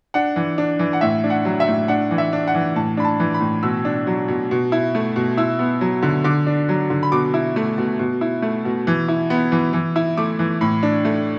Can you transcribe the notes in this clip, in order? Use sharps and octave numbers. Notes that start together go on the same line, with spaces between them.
D4 F#5
E3
D4
E3
F#5
A2 E5
D4
F#5
F#3
E5
A2
D4 F#5
E3
E5
D4
F#5
E3
A2 A5
D4 B5
A5
E3
B5
A2
B2 E6
D4
F#3
B2
B2
E4
A3
B2
E4 E6
B3
F#3
D3
D3 D6
D4
F#3
D3
B5
B2 D6
E4
A3
B2
B2
E4
A3
B2
E3
E4
B3
E3
E3
E4
A3 D6
E3
A2 B5
D4
A3